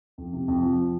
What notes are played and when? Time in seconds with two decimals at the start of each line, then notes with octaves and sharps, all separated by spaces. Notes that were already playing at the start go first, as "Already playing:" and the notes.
0.18 F2
0.33 C3
0.48 F2
0.63 F3